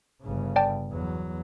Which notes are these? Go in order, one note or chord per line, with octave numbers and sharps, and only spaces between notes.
G1 C#3
D5 G5 A5
E2 F#3